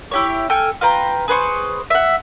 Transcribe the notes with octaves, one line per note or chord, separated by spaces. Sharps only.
E4 G4 C#5
A4 G5 G#5 F6
F4 B4 G5 A#5
G#4 B4 C5 C#6
E5 F#5